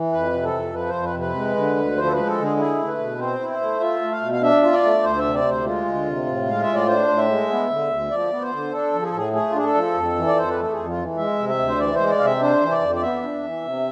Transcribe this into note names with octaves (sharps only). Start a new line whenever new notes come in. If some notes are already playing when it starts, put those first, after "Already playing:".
Already playing: E3
F2 B4
C3
A4
F2
F3 B4
C5
F2
B4
C3
B4
G#3
D3
D2
F3 C5
A4
G#3 B4
A4
D3
G#4
E4 G#4
A3
B4
B2
C4 C5
E4
C5
A3
F4 E5
A3
F5
B2
F5
D4 E5
F4
D5
A3
D2 C5
E5
C3
D5
D2
C5
G#3 F4
D2
C3
A2
G#3 F5
A2 E5
D5
D4 C5
A2
E5
G#3
B3
D3
D2
F3 D5
B3
C5
D3
D4 A4
F3
G#4
A4
A2 G#4
A3 G#4
F4
D4 G#4
A4
F3
F2
E3
D5
F2 C5
B4
A3 A4
G#4
F2
F4
E3
G#3 E5
C3
E5
D2
C5
E3 D5
G#3 C5
D5
C3 F5
E5
D4 C5
E3
D5
F2
D5
B3 E5
D4
E3
C3